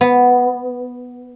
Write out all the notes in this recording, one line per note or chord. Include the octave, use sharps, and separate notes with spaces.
B3